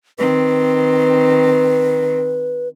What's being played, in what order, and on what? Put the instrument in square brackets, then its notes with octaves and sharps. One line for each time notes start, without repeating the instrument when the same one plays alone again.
[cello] D#3 C4 [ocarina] B4